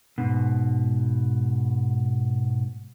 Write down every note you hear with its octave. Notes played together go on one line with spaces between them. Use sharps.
G#2 B2